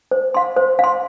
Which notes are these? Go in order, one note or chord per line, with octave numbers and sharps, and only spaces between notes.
C5
F5 C6
C5
F5 C6